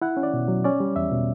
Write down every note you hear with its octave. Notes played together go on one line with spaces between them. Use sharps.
E4 F#5
C#4
D5
B2
F#3
C#4 D5
G3
E2 E5
B2